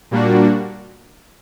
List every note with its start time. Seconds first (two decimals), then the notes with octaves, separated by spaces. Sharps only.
0.11 A#2 G3 A#3 D4 F#4